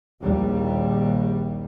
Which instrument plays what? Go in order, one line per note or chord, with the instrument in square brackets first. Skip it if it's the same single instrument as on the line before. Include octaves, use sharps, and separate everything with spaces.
[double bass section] A#1 D#2 G3